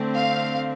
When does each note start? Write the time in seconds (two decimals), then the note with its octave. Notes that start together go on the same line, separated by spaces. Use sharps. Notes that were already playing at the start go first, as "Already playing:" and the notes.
Already playing: D3 A3 C4
0.14 F5